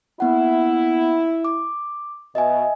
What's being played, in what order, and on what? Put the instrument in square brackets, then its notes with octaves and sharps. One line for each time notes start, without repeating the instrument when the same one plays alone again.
[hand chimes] A#3 B3 F#5 [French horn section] E4
[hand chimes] D6
[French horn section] B2 [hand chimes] D#5 E5 G#5